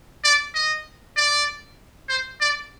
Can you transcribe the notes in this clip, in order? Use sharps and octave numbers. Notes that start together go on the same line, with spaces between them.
D5
D#5
D5
C5
D5